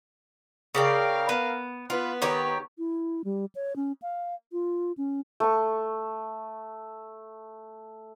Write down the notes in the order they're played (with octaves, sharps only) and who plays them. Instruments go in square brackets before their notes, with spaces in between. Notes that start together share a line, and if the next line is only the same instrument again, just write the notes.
[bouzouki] C#3 D5 G5 [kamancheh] A#4 F5
[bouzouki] B3
[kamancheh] B3 B4 [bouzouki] F4
[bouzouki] D#3 G4 C#5
[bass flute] E4
G3
C#5
C#4
F5
F4
C#4
[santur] A3 C#6